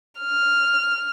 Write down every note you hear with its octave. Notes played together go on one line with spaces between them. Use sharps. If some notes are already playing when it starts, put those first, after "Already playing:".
F6